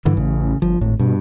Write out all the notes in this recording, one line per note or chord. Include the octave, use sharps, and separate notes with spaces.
G2 D3 E3
A1 C#3
G1 F3
G#1 A2
G2 B2